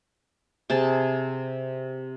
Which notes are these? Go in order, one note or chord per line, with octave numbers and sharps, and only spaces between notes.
C3 G#4 A5